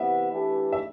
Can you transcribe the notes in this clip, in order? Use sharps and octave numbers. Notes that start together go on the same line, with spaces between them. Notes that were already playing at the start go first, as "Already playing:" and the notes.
Already playing: C3 E3 B3 E5
E3 A3 D4 G4 B4
E5